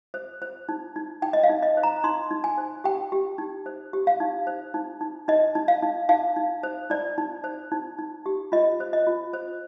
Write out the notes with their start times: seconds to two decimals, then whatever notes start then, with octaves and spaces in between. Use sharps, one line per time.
0.14 C5
0.42 C5
0.69 D#4
0.96 D#4
1.22 D#4 G5
1.33 D#5
1.43 F5
1.49 D#4
1.63 D#5
1.77 C5
1.83 A#5
2.04 D#4 C6
2.31 D#4
2.44 G#5
2.58 C5
2.84 G4 G5
3.12 G4
3.38 D#4
3.66 C5
3.93 G4
4.07 F5
4.20 D#4
4.47 C5
4.74 D#4
5.01 D#4
5.28 D#4 D#5
5.55 D#4
5.68 F5
5.82 D#4
6.09 D#4 F5
6.36 D#4
6.63 C5
6.90 D#4 D5
7.18 D#4
7.44 C5
7.72 D#4
7.98 D#4
8.26 G4
8.52 F4 D#5
8.80 C5
8.93 D#5
9.07 F4
9.33 C5